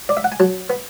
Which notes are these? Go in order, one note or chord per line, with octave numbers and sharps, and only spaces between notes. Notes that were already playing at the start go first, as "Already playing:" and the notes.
D5
E5
F#5
G#5
F#3 A5
B3